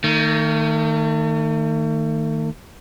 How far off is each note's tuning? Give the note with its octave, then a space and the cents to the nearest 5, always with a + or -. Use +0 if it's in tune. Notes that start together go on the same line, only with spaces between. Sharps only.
D#3 +0 A3 +45